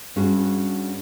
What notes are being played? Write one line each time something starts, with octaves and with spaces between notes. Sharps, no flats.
G2 C#4 F#4 G#4